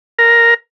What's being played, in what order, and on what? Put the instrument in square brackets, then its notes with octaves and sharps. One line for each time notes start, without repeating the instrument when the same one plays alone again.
[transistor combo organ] A#4